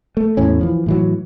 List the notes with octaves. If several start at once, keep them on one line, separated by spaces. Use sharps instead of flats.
A3
E2 A2 C#4
E3 F3
A2 E3 F#3